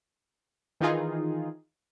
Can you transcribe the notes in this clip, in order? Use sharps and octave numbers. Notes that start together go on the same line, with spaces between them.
D#3 E3 D#4 F4 G#4